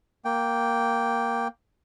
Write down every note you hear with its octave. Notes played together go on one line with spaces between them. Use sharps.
A#3 G5